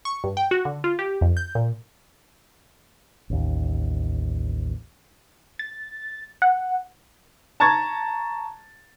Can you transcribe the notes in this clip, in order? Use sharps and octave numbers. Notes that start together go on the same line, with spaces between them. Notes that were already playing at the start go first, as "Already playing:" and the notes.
C#6
G2
G5
F#4
D3
F4
G4
F2
G6
A#2
A1 D#2
A6
F#5
A5 A#5 C#6 G#6 A6